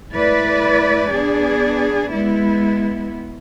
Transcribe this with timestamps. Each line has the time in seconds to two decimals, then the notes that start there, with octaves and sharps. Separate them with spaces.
0.12 A3 E4 B4 D5
1.11 B3 D4 G#4 D5
2.12 G#3 B3 E4